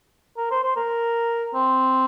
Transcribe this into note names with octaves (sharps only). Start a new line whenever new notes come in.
A#4
C5
C5
A#4
C4